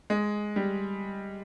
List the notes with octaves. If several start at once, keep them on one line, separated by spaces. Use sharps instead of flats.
G#3
G3